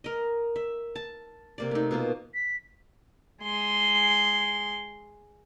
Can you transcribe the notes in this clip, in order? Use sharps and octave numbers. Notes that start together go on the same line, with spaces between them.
A#4 D#5
E5
A5
C3 A#3 D5
A3 D#4
B2 A#3 F4
B6
G#3 C6